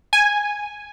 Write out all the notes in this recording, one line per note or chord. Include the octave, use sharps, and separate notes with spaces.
G#5